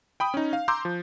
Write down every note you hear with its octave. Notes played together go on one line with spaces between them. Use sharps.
G5 B5 D#6
C#4 D#4
F5
A#5 C6 D6 E6 G6
F3